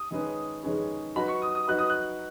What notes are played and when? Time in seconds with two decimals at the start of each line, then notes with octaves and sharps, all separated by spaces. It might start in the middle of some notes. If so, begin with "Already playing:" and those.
Already playing: D#6
0.11 D#3 G#3 C#4 G#4 B4
0.63 D#3 G#3 C#4 G#4 B4
1.16 F#3 D#4 F#4 B4 B5
1.28 C#6
1.42 D#6
1.55 D#6
1.68 F#3 D#4 F#4 B4 F#6
1.79 D#6
1.90 F#6